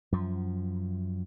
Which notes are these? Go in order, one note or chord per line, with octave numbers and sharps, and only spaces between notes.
F#2 F3